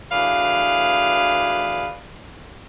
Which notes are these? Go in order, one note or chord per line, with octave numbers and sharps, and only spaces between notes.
D2 E3 G#4 B4 D5 F5